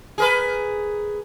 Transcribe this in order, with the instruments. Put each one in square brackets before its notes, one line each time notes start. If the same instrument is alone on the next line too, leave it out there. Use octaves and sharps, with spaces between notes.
[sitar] G#4 A#4 B4